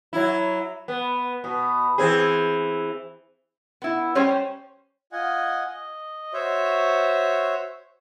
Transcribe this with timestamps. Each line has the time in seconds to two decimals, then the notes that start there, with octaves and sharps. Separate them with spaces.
0.13 F#3 E4
0.88 B3
1.44 B2
1.98 E3 C4 G#4
3.82 B3 E4
4.15 G3 C#4 C5 C#5 G5
5.12 F4 D#5 F#5 G#5
5.66 D#5
6.33 F#4 C5 C#5 E5